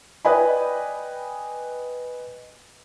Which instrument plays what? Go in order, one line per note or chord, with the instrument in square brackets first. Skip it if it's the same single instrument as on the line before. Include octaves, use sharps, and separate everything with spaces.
[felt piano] B4 D5 D#5 G5 G#5 B5